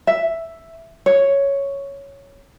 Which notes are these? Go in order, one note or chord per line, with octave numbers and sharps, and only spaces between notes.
E5
C#5